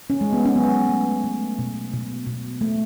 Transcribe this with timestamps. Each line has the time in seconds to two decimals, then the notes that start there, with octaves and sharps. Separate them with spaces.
0.10 C#4
0.21 G#3
0.33 B3
0.46 C#4
0.55 F#3 B3
0.89 A3
1.24 A3
1.59 B2
1.93 B2
2.26 B2
2.61 A3